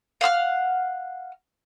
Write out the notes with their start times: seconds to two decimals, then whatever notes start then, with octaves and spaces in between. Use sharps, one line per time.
0.21 F5 F#5 E6 F6